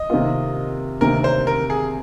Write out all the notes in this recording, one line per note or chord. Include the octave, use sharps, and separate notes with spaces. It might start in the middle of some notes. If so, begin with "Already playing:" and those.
Already playing: D#5
C3 D#3 A#3 F4
D2 C3 D#3 A#3 A#4
C5
A#4
G#4